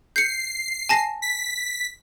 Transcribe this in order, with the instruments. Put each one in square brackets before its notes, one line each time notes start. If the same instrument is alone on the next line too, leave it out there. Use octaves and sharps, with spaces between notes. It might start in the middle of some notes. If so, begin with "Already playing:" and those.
[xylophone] G6 C#7 [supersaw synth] C7
[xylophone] G#5 A5 A#6
[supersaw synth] B6